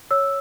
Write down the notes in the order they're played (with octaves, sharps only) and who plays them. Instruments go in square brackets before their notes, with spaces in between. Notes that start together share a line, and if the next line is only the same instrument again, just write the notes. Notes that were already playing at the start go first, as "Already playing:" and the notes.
[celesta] C#5 E6